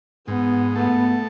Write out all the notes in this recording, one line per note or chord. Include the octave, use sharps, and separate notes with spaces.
G#2 B3
A3 B3